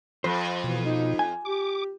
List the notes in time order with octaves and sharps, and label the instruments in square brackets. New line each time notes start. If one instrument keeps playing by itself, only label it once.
[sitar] F2 [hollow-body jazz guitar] C5
[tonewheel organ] B2 [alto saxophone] E3
[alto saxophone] D#4
[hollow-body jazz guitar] G#5
[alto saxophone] G4 [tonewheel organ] D6